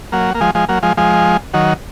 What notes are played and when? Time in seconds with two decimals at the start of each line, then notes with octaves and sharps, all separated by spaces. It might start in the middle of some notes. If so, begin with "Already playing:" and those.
0.12 F#3 A#3
0.35 A#3
0.41 F3 G#3
0.55 F3 G#3
0.69 F#3 A#3
0.83 F3 G#3
0.97 F3 G#3
1.54 D#3 F#3